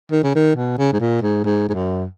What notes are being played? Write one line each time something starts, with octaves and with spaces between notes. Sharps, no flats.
D#3
C#3
D#3
B2
C#3
G#2
A#2
G#2
G#2
G#2
F#2